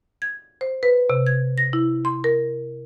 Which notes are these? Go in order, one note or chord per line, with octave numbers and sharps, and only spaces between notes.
G#6
C5
B4
C3
G#6
A#6
E4
C6
A#4